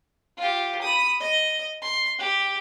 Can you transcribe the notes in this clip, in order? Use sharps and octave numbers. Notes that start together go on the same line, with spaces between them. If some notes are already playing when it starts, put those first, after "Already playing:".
F4 G4
B5 D#6
D#5
C6
G4